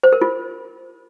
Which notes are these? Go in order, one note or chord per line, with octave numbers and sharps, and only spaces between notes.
C5
A#4
F4